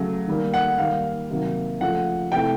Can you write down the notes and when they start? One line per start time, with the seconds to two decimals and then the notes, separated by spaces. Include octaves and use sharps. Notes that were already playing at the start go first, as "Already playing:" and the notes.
Already playing: C#3 F#3 A3
0.28 D#3 G3 A#3
0.54 F#5
0.78 D#3 G3 A#3 F5
1.30 C3 D#3 F#3 A#3
1.80 C#3 F3 A3 F#5
2.32 C3 E3 A3 G5